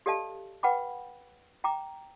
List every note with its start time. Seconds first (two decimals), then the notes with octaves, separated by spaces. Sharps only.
0.06 G4 A4 D5 D#5 F5 A5
0.63 B4 F#5 G5 B5 D6
1.64 G5 A#5 D6